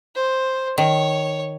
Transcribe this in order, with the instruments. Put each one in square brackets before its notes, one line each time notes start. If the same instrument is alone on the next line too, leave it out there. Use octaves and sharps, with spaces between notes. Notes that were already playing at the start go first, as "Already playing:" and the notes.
[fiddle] C5
[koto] D#3 [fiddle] C#5